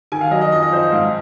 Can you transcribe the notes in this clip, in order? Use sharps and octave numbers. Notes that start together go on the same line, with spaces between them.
D#3 G#5
F5
F#3 D#5
D#5
F2 D#5
D#5
F2 C5
D#5
G#2 F5